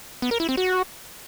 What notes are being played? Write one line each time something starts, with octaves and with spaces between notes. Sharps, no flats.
B3
A#4
E4
C4
F#4